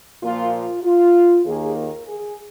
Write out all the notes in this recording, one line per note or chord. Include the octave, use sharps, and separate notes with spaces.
A#2 F3 A#3 F4
F4
F4
D#2 D#3 A#3 G#4
A#4
G#4